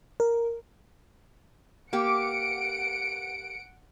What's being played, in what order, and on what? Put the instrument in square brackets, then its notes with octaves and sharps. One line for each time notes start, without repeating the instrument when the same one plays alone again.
[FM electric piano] A#4
[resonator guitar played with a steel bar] A#3 G4 [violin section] F#5 C#7 D7